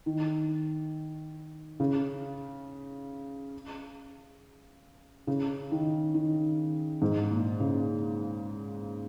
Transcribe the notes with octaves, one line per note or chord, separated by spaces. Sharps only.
D#3
C#3
C#3
D#3
D#3
G#2
A#2
C#3